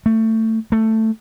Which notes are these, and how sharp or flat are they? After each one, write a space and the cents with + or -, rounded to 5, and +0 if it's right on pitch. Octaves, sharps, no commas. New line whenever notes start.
A3 +20
A3 +10